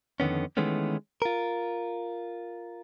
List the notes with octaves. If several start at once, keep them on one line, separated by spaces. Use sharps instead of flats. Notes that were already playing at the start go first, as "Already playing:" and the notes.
F2 D3 D#3 B3 C#4
D#3 E3 G#3 A3 B3 C#4
F4 A#4